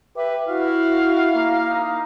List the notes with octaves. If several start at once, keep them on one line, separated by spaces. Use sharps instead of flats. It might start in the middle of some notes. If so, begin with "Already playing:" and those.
G4 B4 E5
E4 F#4 F5
A#3
D#4